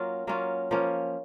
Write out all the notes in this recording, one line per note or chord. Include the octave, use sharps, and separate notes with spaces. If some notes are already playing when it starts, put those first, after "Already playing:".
Already playing: F#3 A#3 C#4 F4
F#3 A#3 C#4 F4
F3 A#3 C#4